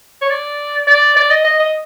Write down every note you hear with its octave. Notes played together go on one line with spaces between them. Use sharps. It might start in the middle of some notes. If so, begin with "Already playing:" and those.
C#5
D5
D5
D5
D#5
D#5
D#5